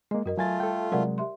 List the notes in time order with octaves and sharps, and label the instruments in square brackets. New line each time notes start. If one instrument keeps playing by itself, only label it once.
[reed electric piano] G#3 A#3 [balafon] D#5
[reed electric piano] F#2 [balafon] F#4 A#4 D#5
[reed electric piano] F#3 G#5 A6 [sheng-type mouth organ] A3 F4
[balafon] G3 [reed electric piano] A4 G5
[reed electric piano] C3 F#3 G#3 [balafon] A#4 D5 F#5
[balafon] G4 E5 C6